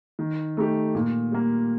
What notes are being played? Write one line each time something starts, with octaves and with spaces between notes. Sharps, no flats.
D#3
A3 D#4 G4
A#2
G3 A#3